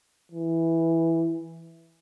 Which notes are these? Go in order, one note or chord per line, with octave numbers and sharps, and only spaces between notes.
E3